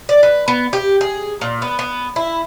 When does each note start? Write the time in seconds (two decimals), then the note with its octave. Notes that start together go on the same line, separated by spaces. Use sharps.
0.09 D5
0.23 B4
0.48 B3
0.73 G4
1.01 G#4
1.41 A#2
1.62 B3
1.79 B3
2.16 E4